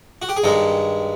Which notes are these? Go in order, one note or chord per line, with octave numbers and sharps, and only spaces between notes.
F#4
G4
G#4
G2 D#3 G#3 A4